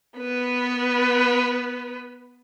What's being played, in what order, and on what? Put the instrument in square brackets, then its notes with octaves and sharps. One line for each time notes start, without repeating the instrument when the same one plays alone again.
[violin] B3 B4